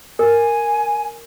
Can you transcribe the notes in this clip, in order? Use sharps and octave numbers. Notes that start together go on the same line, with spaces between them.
A#4 G#5